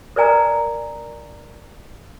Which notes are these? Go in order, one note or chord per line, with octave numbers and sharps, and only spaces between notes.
A#4 B4 D5 G#5 A#5